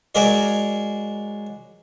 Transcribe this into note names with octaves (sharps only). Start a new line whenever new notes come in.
F#3 G#3 G#4 A#4 D5